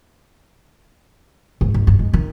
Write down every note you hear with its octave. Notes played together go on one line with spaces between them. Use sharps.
G#2
G#1
G2
G#3
D#3